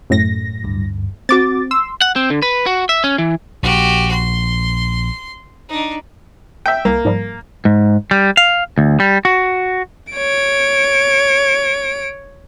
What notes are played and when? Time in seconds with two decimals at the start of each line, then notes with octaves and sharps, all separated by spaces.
0.10 F#2 A2 A#6
0.64 D2 G2
1.29 C4 F#4 D6 A6
1.71 C6 E6
2.01 F#5
2.16 C4
2.30 D3
2.42 B4
2.66 F#4
2.89 E5
3.04 C#4
3.18 E3
3.63 A#1 F#4 G4
4.11 C6
5.69 D4 D#4
6.66 E5 G5
6.85 C2 A#3
7.05 G#2 F3 G3
7.65 G#2
8.11 G3
8.37 F5
8.78 D2
9.00 G3
9.25 F#4
10.13 C#5 D7